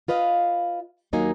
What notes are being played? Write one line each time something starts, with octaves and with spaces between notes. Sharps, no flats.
F4 B4 D#5 F5
D#2 F#3 A#3 D#4 G#5